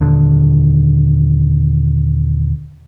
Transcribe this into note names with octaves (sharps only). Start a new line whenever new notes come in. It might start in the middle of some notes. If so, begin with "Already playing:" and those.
D#1 D3